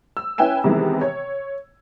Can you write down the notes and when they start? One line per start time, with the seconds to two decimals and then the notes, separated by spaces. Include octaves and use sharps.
0.17 E6
0.38 C#4 E4 B4 G5 G#5 E7
0.64 C3 D#3 E3 G#3 B3
1.01 C#5